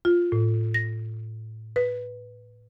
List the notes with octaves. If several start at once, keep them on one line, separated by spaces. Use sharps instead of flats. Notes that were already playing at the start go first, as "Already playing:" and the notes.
F4
A2
A#6
B4